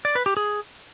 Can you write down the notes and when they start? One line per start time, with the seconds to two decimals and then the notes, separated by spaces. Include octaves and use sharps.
0.05 D5
0.15 B4
0.26 G4
0.37 G#4